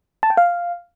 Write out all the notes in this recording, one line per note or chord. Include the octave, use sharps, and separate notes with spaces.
A5
G5
F5